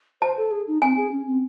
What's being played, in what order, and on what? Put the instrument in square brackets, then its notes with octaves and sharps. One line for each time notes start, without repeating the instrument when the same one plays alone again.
[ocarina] C5 [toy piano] A5
[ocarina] A4
G#4
D#4
[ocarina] C4 [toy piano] G#5
[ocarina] G#4
C#4
C4